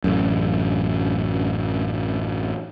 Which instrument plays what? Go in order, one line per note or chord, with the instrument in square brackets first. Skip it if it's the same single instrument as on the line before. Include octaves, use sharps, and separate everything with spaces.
[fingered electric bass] A1 F#2